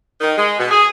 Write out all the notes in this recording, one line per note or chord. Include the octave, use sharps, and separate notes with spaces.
D#3
G#3
B2
G#4